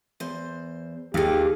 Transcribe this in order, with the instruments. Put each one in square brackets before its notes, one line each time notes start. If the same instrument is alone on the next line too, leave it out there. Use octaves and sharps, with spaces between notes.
[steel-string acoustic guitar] E2 C5
[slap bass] D#2 [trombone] G4 [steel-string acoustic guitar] G#4 F5